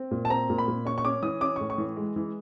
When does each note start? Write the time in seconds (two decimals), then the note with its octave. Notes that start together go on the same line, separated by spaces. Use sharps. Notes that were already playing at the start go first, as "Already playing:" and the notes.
Already playing: C4
0.11 A#2
0.25 A5
0.30 C4 A#5
0.50 A#2
0.58 B5
0.68 A#2
0.85 C#4 C#6
0.98 C#6
1.05 C#4 D6
1.22 E3 D#6
1.41 C#4 D6
1.56 A2 C#6
1.70 C#6
1.78 E3
1.97 G#3
2.16 E3